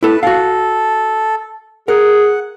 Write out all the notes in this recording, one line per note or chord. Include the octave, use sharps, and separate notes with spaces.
E4 A4 B4
F#4 A4 F5
G#4 A#4 F#5